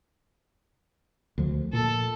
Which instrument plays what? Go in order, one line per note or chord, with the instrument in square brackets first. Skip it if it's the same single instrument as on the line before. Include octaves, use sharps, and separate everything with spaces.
[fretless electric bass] D2 F3
[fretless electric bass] A#2 [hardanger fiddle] A4